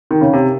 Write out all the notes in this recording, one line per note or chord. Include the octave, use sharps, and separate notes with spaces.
D#3
C#3
C3